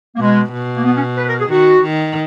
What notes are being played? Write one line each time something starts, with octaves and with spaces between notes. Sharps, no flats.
A#3
B2 G#3
B2
A#3
B3
C#4
B4
A#4
G#4
D#3 F#4
D#3